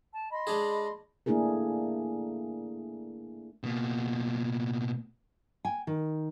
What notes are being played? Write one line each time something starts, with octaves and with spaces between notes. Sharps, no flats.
A5
D#5 B5 C6
G#3 D4 G#4
A3 A#3 D4 E4 G#4 A#4
B2 A#3
G5 G#5
D#3